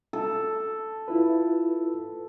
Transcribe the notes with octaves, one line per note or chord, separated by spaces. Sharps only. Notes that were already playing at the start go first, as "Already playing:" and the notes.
A4
E4 F4 B4